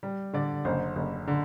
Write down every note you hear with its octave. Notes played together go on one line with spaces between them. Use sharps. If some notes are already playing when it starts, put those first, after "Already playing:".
G3
D3 D5
F#1 C5
F#1
D3